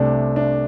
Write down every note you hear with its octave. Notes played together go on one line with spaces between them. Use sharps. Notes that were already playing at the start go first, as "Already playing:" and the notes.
Already playing: C2 C3 A3 D4
D4